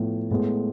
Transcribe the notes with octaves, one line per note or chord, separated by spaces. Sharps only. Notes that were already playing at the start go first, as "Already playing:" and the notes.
Already playing: A2 F3 B3
A2 G#3 B3